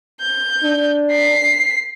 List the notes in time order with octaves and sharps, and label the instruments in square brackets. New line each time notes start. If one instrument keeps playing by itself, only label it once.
[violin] G6
[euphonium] D4
[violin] B6 C7